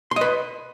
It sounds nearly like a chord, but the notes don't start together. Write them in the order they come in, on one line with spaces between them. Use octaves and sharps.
C6 D#5 B4